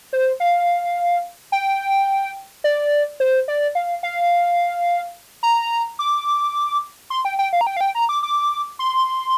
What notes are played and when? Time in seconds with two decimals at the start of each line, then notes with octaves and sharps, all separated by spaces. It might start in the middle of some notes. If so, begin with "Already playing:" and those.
0.13 C5
0.40 F5
1.52 G5
2.64 D5
3.20 C5
3.48 D5
3.75 F5
4.03 F5
5.43 A#5
5.99 D6
7.10 C6
7.25 G5
7.39 G5
7.53 F5
7.61 A#5
7.67 G5
7.77 F5
7.81 G5
7.95 A#5
8.09 D6
8.23 D6
8.79 C6